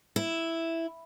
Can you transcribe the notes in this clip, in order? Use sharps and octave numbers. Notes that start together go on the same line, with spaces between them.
E4